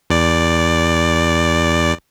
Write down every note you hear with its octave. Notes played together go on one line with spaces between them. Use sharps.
E2 D5